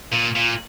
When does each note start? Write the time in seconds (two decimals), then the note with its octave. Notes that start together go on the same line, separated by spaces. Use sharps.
0.13 A#2
0.36 A#2